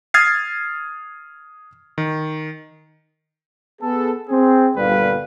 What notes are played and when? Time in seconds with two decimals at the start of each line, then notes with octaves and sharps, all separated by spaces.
0.14 D#6 F6 G#6 A6 C7
1.98 D#3
3.80 B3 G#4 A4
4.29 C4 G#4
4.77 G1 A#2 D3 G3 B4 F5